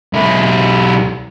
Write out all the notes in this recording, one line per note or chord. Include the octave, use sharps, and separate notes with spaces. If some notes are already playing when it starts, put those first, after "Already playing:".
B1 E4